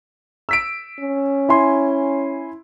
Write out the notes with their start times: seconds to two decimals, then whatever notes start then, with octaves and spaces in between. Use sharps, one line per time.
0.49 E6 B6 D7
0.99 C#4
1.49 E4 G#5 C6